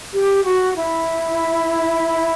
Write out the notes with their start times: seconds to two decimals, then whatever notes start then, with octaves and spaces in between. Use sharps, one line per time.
0.13 G4
0.44 F#4
0.76 E4